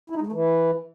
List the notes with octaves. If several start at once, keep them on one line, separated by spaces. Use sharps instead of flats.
E4
D#4
G#3
A3
E3